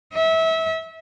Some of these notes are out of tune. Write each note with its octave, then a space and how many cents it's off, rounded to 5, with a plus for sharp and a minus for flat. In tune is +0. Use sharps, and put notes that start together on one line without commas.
E5 -25